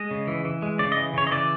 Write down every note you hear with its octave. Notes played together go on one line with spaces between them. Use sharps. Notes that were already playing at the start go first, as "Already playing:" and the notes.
Already playing: G#3 D#5
C#3
E3
E3
G#3
C#3 D5
D#5
E3
C#3 C#5
D#5
E3 D5